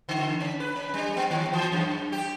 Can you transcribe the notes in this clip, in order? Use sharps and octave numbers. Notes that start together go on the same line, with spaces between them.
D3
C#4
B4
C#4
G3
B3
D#3
E3
F#2
G4